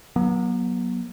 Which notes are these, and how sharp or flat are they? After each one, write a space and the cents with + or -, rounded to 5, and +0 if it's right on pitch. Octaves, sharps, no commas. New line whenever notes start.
F#3 +0 B3 -45